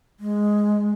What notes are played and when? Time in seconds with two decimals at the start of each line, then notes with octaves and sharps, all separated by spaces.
0.20 G#3